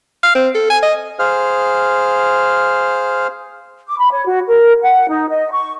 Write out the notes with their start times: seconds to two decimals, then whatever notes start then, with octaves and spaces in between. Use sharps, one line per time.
0.23 F5
0.35 C4
0.55 A4
0.70 G#5
0.83 D#5
1.19 G#4 C5 F5 F6
3.87 D6
3.99 B5
4.12 C#5
4.26 F#4
4.47 A#4
4.81 F#5
5.10 D#4
5.29 D#5
5.51 C#6